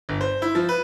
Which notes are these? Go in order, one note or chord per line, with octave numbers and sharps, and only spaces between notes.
G1
C5
E4
F3
B4